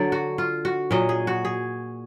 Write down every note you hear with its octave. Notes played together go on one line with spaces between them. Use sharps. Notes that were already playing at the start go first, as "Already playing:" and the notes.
Already playing: D3 F#3 D5
F#4
F4
F#4
A#2 F#3 D#5
G#4
F#4
G#4